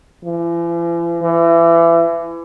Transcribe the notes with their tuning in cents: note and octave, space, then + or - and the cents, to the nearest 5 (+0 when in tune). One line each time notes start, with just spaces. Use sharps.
E3 +45
E3 +30